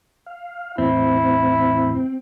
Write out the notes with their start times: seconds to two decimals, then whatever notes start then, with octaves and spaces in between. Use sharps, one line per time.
0.26 F5
0.78 E2 A2 E3 C4 E4